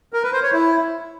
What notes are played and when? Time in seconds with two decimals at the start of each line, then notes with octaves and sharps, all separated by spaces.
0.13 A#4
0.23 B4
0.33 C5
0.43 C#5
0.52 E4